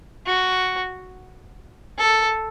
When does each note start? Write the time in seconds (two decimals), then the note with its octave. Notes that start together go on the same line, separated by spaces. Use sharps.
0.27 F#4
1.99 A4